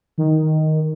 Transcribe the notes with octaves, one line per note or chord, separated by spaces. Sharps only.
D#3